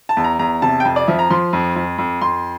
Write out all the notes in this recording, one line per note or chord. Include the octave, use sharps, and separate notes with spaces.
A5
E2
A#5
E2 A#5
C3 A5
G5
F2 A5
D5
F3 E5
A#5
F3 C6
F2
F2
F2
F2 C6